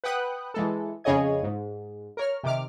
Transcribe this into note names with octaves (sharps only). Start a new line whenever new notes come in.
B4 F#5 G5 D#6 F#6
E3 G#3 A4
F2 C#3 G#4 C#5 D#5 G#6
G#2
A#4 C#5 F6
C3 D#3 D6 F6